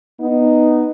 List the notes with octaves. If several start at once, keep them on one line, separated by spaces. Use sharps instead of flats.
B3 D#4